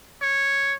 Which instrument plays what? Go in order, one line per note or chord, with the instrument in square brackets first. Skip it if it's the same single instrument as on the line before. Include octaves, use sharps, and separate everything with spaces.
[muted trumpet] C#5